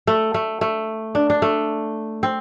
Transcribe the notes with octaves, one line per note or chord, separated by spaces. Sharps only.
A3
A3
A3
D4
D4
A3
C4